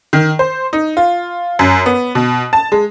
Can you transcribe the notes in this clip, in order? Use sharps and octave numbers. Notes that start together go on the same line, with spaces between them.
D#3
C5
D#4
F4
F#2
B3
B2
A5
G#3